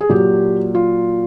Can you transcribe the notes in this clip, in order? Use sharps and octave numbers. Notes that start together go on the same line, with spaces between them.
G#4
A#2 F#3 G4
F4